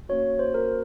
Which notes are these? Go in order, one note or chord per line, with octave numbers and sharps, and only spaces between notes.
A#3 C#4 F#4 C#5
C5
A#4